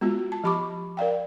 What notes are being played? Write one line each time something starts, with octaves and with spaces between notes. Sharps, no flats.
G#3 B3 F4 F#4
A5
F3 G4 B5 C#6 D6
A#4 D5 F5 G5